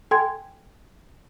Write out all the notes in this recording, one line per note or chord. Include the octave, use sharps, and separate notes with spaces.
A4 G5 G#5 C6 G#6